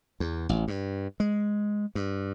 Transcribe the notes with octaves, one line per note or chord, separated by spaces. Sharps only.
E2
A1
G2
G#3
G2